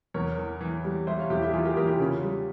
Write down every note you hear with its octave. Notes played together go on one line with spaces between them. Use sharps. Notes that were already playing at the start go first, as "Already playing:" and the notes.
E2 A#4 C#5
E3
E3
G3
G3 C5 E5
C#5 F5
E2 E4 G4
E4 G4
E3 F4 G#4
G4 A#4
E2 G4 A#4
E4 G4
C#3 C#4 F4
G3